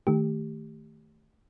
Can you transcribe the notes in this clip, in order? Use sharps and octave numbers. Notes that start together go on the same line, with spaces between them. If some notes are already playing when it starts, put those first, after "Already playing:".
D#3 A3 G4